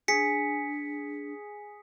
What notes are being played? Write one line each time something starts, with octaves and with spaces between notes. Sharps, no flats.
D4 G#4 B6 C#7